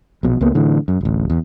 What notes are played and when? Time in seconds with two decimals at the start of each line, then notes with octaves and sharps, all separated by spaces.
0.23 A#1 B2
0.41 C#2 A#3 B3
0.55 A2 D3 E3
0.88 F#2
1.01 D1 A1
1.30 E2